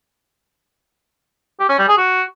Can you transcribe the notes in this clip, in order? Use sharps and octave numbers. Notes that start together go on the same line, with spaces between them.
G4
C#4
G3
G#4
F#4